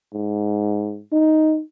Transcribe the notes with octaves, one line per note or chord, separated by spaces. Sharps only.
G#2
D#4